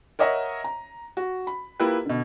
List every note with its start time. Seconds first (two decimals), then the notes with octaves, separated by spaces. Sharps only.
0.19 A#4 C#5 D#5 E5 F#5 A#5
0.64 A#5
1.17 F#4
1.47 B5
1.80 A#3 E4 F4 G4 B4
2.06 B2 D3